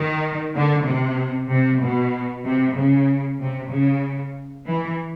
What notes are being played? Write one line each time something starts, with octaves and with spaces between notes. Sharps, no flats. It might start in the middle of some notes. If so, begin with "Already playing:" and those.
Already playing: D#3
D3
C3
C3
B2
C3
C#3
C3
C#3
E3